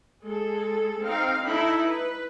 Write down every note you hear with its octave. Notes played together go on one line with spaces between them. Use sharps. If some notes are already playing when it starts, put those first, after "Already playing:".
G#3 G#4 A4
C4 D#4 F5
D#4 E4 A4 B5
B4